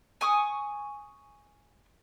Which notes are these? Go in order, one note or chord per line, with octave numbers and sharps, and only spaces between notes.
G#5 C#6 D#6